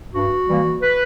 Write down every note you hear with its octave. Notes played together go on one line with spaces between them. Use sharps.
G2 F#4
E3 G3 A#3
B4